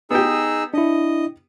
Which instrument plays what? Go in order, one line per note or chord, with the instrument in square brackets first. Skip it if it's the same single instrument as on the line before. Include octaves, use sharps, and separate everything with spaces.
[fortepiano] B3 G4 [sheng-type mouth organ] D#4 G#4 E6
[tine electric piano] D4 E4 [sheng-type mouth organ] D#5